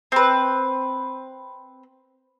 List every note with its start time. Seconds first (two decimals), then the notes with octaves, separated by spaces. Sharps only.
0.12 C4 B4